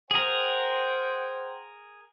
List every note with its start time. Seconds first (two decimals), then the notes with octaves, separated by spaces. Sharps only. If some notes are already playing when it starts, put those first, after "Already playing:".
0.11 G#4 A#4 C5 F#5 G5